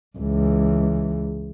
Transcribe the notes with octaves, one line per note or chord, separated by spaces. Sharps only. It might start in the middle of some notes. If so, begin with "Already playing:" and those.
C#2 E3